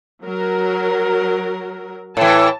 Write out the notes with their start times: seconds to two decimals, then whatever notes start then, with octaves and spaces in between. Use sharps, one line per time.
0.23 F#3 A#4
2.17 A2 E3 A5